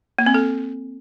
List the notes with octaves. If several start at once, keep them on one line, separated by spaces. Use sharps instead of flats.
A#3
C4
A4